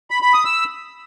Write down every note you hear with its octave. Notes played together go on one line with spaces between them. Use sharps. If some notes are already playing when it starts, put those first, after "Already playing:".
B5
B5
D#6
E6